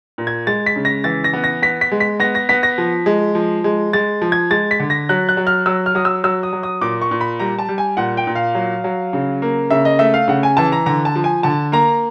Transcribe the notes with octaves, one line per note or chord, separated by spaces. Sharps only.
A#2
G#6
G#3 A6
B6
C#3
A#6
E3 A6
A#6
B3
A#6
B3 B6
B6
G#3
B6
B3 A#6
A#6
B3 B6
A#6
F3
G#3
F3
G#3
G#3 A6
F3
G#6
G#3 A6
B6
D3
A#6
F#3 F#6
F#6
F#3
F6
F#3 E6
F6
F#3 D#6
E6
F#3 E6
D#6
F#3
D#6
A#2 D6
C#6
A#2
B5
G3 A#5
A5
G3
G#5
A#2 F#5
G5
A#2
F5
F#3
F#3
C#3
A#3
C#3 E5
D#5
A3 E5
F5
C#3 F#5
G#5
E3 A5
A#5
D3 A#5
A5
F3
G#5
D3 A5
A#3 A#5